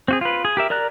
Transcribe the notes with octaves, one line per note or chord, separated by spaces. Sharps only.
C4 F#4 G#4
F4 B4
G#4
G4 A#4 E5
A#4 D5 A#5 F#6